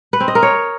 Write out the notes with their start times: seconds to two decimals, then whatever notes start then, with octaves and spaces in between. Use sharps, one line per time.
0.13 B4
0.20 C4
0.28 D#5
0.35 A#4
0.43 C#5